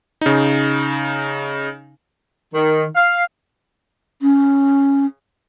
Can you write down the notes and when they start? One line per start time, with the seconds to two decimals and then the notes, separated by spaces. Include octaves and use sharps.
0.21 C#3 D#4
2.54 D#3
2.95 F5
4.22 C#4